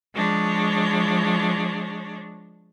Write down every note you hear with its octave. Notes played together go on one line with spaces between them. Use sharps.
F3 G#3 D4 C#5